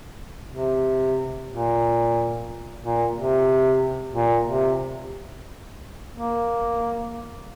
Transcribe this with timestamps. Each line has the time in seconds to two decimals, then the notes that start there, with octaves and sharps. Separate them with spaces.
0.50 C3
1.50 A#2
2.82 A#2
3.15 C3
4.15 A#2
4.48 C3
6.15 A#3